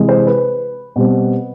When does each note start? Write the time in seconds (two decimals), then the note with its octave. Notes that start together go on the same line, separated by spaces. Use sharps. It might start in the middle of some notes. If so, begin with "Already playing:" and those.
Already playing: C3 E3 G#3
0.09 C5
0.26 B4
0.96 B2 G3 C4